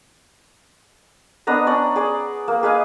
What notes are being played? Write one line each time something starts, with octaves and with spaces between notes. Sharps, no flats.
B3 D4 D#5 A#5
C#4 D5
G#4 D5
A#3
G#4 B4 D#5 F5